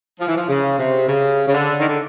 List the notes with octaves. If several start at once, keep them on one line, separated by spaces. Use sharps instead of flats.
F3
E3
F3
C#3
C3
C#3
C#3
D3
D#3
D3